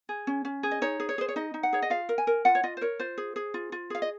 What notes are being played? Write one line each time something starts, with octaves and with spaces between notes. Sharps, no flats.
G#4
C#4
C#4
G#4
D#5
D#4 C#5
G#4
C#5
G#4 C5
C#5
D#4 D#5
D#4
F#5
G#4 C#5
D#5
F4 F5
A#4
G#5
A#4
F4 F#5
C#5
F4 D#5
C5
A#4 C#5
F4 C5
G#4
G#4
F4
F4
G#4 F5
D#5